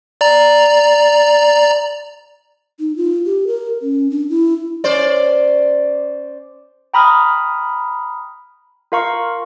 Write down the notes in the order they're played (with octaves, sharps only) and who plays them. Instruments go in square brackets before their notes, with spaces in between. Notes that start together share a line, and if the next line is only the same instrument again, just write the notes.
[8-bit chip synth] D5 A#5
[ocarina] D#4
F4
G4
A#4
C#4
D4
E4
[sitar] C#4 C5 D5
[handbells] G5 A#5 B5 D#6 F6
F4 A#4 F5 A#5 C#6